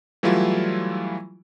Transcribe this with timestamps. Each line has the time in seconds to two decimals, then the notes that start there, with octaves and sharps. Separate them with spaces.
0.23 E3 F#3 G3 A3 E4 F4